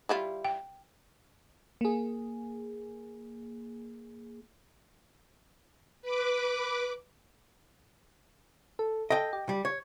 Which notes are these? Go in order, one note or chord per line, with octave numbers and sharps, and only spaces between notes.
G3 E4 F4
G5
A#3 G#4
B4 D6
A4
A4 D#5 G5
G4
G3
C#5